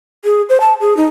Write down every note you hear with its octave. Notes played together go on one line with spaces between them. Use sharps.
G#4
C5
A5
G#4
D#4